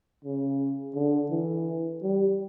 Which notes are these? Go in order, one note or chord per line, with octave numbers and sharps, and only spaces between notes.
C#3
D3
E3
G3